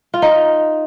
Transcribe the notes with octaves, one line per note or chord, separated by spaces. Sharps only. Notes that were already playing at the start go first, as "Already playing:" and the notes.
F4
D#4
F4